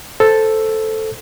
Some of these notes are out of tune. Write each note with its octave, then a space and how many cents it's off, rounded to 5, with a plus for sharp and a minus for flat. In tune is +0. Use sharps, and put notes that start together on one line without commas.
A4 +0 C5 +0